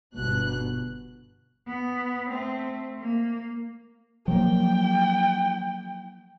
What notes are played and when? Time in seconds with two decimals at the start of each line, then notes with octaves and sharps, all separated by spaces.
0.15 G1 B2 F#6
1.67 B3
2.29 A3 C4
3.00 A#3
4.28 F3 F#3 A#3 G5